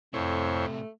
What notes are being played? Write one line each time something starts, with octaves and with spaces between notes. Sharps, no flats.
F2 A2 C3 A3 E4 C5 C#5